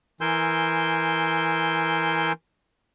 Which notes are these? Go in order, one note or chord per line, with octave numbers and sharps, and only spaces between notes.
E3 A#4 G#5 C6 E6 G6